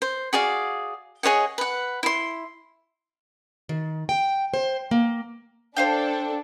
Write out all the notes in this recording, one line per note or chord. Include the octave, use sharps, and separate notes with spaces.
C5
F#4 G#4 D5 F5
G#4 C#5 D#5 F#5
B4 F#5
E4 C6
D#3
G5
C5
A#3
D4 A4 C5 F5 G5